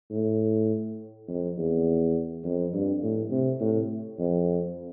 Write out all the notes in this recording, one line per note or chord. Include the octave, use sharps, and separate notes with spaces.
A2
F2
E2
F2
G2
A2
C3
A2
F2